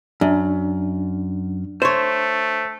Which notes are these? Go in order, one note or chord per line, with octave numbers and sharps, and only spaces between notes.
F#2 D4
A3 C5 C#5